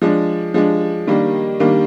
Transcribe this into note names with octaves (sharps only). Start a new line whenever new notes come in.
F3 G#3 D4
F3 G#3 D4
D#3 G3 A#3 D4
D#3 G3 A#3 D4